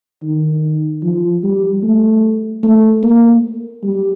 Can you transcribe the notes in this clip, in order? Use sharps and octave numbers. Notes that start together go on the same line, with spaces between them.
D#3
F3
G3
A3
A3
A#3
G3